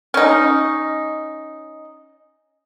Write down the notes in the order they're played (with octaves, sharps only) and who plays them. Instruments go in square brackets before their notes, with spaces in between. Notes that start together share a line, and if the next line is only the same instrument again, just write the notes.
[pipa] C#4 D#4